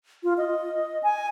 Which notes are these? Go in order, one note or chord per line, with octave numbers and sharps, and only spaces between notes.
F4
D#5
G#5